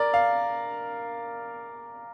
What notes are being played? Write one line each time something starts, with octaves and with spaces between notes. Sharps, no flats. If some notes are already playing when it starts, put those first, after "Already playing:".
Already playing: A#4 D5
F5